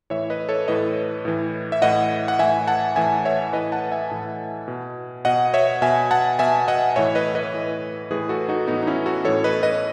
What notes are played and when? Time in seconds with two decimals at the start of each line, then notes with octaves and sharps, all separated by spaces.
0.10 A2 E3 C#5 E5
0.30 B4 D#5
0.49 A4 C#5
0.68 A2 E3 B4 D#5
1.25 A2 E3
1.72 E5
1.82 A2 E3 D#5 F#5
2.28 F#5
2.39 A2 E3 E5 G#5
2.67 F#5 A5
2.96 A2 E3 E5 G#5
3.25 C#5 E5
3.53 A2 E3 B4 D#5
3.72 F#5 A5
3.91 E5 G#5
4.11 A2 E3
4.68 B2
5.25 B2 D#5 F#5
5.54 C#5 E5
5.82 B2 E5 G#5
6.11 F#5 A5
6.39 B2 E5 G#5
6.68 D#5 F#5
6.96 A2 E3 C#5 E5
7.15 B4 D#5
7.35 B4 D#5
7.54 A2 E3
8.11 A2 E3 G#4 B4
8.29 F#4 A4
8.48 D#4 F#4
8.67 A2 E3 B3 D#4
8.82 D#4
8.87 C#4 E4
9.06 F#4 A4
9.25 A2 E3 A4 C#5
9.44 B4 D#5
9.63 B4 D#5